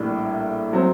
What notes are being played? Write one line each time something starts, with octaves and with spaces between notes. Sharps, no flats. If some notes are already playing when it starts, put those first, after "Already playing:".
Already playing: A#1 A2 G3 A#3
F#3 C4